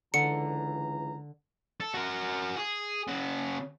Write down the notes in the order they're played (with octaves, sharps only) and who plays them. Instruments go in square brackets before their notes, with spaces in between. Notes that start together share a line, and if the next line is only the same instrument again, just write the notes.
[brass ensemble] C#2 E3 A#5 [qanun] D3 [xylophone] C#7
[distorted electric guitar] A4
F#4 A#4
G#4
C#3 F#4